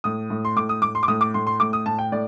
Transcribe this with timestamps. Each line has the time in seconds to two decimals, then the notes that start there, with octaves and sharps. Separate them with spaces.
0.04 A2 D#6
0.30 A2
0.45 C6
0.56 A2 D6
0.69 D#6
0.82 A2 D6
0.95 C6
1.03 D6
1.08 A2 D#6
1.21 D6
1.34 A2 C6
1.47 C6
1.60 A2 D6
1.73 D#6
1.86 A2 A5
1.99 G5
2.12 A2 D5